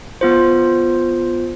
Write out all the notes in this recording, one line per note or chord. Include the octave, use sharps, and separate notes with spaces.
B3 F4 C5